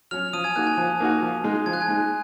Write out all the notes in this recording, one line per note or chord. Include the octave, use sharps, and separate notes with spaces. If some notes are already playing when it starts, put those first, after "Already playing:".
F#3 C#4 F6 F7
F3 D#6 D#7
G#5 G#6
A#3 D#4 F#4 F#6
G#5 G#6
F3
A#3 D#4 F#4
F3
G#3 D#4
F3 G#6
F#6
G#5 G#6
G#3 D#4